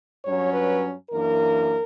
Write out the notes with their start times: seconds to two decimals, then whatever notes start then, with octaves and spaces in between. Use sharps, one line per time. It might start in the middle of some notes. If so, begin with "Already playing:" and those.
0.24 G2 F#3 C#4 C#5
0.53 B4
1.10 F#2 E3 A#3 D4 A#4